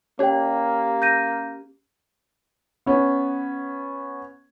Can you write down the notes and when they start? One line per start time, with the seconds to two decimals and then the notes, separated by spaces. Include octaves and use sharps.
0.19 A#3 C#4 G4 C#5 G5
1.02 G6 A#6 D#7
2.86 B3 C#4